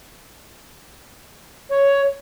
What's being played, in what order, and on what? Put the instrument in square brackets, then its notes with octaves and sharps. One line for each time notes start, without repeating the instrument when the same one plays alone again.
[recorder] C#5